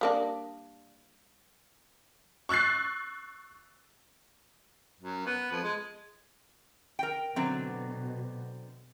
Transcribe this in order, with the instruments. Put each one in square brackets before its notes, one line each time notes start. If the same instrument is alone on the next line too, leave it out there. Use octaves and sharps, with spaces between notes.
[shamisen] G3 A#3 D4
[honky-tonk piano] C#6 E6 F#6 A6 C7
[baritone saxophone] F#2
B3
F2
G#3
[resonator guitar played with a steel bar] A#4 G5
[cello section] B2 [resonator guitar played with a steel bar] D3 F#3 C4